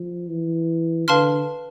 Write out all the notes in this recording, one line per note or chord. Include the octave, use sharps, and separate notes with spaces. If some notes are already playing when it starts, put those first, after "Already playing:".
Already playing: F3
E3
D3 B4 F5 A5 C6 F6